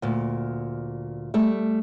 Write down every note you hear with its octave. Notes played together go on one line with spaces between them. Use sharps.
D2 A#2
G3 A3